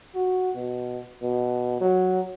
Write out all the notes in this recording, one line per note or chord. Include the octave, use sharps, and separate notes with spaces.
F#4
B2
B2
F#3